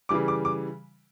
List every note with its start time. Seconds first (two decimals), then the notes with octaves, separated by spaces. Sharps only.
0.09 C#3 E3 G3 D6
0.28 D6
0.45 D6